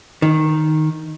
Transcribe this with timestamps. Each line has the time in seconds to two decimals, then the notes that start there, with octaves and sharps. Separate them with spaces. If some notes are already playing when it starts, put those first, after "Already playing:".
0.22 D#3